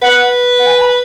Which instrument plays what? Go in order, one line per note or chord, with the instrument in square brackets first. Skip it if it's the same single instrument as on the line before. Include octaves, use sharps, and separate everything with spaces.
[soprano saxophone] B4 [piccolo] F#5
[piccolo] F#5
G#5
G#5
B5